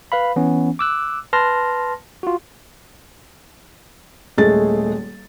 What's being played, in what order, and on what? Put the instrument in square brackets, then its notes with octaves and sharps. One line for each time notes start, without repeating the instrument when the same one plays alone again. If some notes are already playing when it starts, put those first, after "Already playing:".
[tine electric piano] B4 F5 B5
E3 B3 C#4
D6 E6 F#6
B4 A5 C6 F6 A#6
F4 F#4
[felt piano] D#1 G#3 A3 G#4 A6